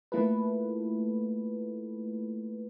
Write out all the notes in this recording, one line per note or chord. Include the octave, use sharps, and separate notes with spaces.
A3 A#3 E4 F4 A4 B4